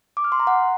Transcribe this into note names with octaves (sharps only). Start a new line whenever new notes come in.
D6
F6
C6
A#5
F#5